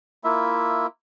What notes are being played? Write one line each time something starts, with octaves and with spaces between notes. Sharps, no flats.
A#3 E4 F4 E5